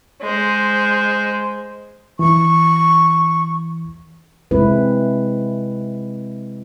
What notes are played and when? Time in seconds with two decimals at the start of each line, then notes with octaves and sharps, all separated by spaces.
0.22 G#3 C5
2.19 E3 C#6
4.51 C3 G#3 C4 E4 B4